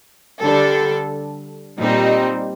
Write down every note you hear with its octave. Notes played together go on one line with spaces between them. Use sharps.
D3 G3 D4 A4
A#2 G3 C4 D#4